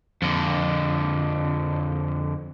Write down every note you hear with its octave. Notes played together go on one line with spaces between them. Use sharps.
F2 D3